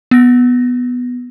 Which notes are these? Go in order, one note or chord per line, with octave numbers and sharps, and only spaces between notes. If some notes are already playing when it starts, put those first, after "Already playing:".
B3 A#6